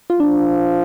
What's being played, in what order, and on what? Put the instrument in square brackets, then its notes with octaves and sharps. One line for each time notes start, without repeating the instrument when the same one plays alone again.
[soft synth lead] F4
[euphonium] F3 [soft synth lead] D4